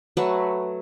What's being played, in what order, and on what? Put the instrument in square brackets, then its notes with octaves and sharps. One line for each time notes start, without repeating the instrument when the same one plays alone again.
[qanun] F#3 A3 B4 F#5